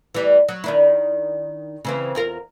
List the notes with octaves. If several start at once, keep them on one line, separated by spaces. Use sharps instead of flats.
E3 G3
F#3
D#3 D4 E4
C#3 E3 C4
E2 F4 A#4